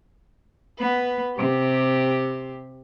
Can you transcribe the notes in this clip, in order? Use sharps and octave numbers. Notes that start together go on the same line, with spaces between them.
B3 B4
C3 G4